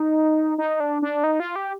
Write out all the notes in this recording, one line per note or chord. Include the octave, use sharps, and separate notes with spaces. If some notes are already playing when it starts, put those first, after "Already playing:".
Already playing: D#4
D#4
D4
D4
D#4
F4
G4